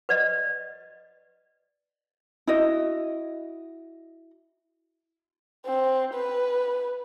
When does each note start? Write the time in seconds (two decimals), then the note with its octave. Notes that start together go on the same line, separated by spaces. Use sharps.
0.09 B4 D5 D#5
2.47 E4 F#4 D#5
5.66 C4
6.14 B4